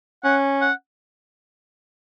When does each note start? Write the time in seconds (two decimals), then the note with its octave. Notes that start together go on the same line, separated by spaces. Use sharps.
0.24 C#4 F#5
0.61 F#5